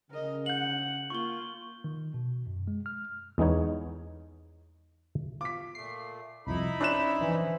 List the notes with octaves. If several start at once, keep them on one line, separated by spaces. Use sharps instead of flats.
C#3 A#4 D#5
F#5 G6 F#7
A#3 F4 C#6 G7
D#3
B2
F#2
G#3
F6
E2 G#3 B3 D#4 C#5
F4 D6 B6
A#2 A3 C7
C2 F2 D#4 E4 B5
C#4 D4 C5 E5 F#6 E7
E3